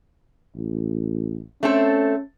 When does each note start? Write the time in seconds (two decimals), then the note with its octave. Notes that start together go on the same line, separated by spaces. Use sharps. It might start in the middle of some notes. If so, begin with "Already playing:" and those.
0.56 A1
1.63 A3 C4 C#4 A4